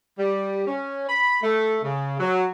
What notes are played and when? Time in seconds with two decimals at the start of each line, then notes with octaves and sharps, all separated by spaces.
0.19 G3
0.68 C#4
1.09 B5
1.43 A3
1.84 C#3
2.20 F#3